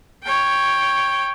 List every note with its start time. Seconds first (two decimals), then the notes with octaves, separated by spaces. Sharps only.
0.23 C#5 G5